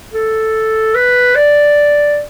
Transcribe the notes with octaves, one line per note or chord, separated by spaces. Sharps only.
A4
B4
D5